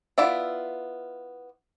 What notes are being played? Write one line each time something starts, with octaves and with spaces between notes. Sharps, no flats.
B3 E4 F4 D5 E5